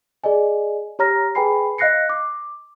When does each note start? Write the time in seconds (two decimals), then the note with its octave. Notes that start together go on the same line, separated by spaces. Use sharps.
0.24 G#4 D5 D#5 G#5
0.99 G4 C#5 A#5 F6 A#6
1.35 G#4 B4 G5 G#5 B5 C7
1.78 D#5 F5 F#6 A#6 C7 C#7
2.09 D6